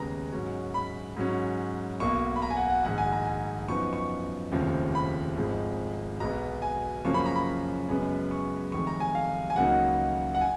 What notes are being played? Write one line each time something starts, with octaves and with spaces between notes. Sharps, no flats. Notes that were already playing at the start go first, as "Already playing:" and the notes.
Already playing: D#2 C#3 G#3 B3 A#5
G#2 F#3 C#4
B5
G#2 F#3 C#4
B1 B2 A#3 C#6
B5
A#5
G#5
F#5
F#5
A#1 G#2 D#3 F#5
G#5
A#5
G#5
F#2 F3 B3 D#4 C#6
C#6
F1 D#2 C#3 F3
B5
G#1 G#2 F3 G#3
B1 B2 G#3 B3 A#5
G#5
F#2 C#3 F3 A#3 C#4 C#6
B5
A#5
B5
F#2 C#3 G#3 B3
C#6
F1 F2 D#3 G#3 C#6
A#5
G#5
F5
G#5
C#2 C#3 F#3 A#3 D#4 F#5
F#5
G#5